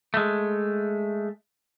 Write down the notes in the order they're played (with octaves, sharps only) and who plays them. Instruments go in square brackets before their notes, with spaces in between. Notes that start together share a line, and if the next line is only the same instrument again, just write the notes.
[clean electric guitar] G#3 A3